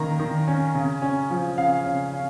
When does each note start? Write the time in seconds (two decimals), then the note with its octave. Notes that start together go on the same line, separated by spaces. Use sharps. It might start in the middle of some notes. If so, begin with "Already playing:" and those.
Already playing: D#3 A#3 C#4 A#5
0.20 D#3
0.48 C#4
0.75 C#3
1.02 C#4
1.30 F3
1.58 C#3 F5
1.85 C#3
2.13 C#4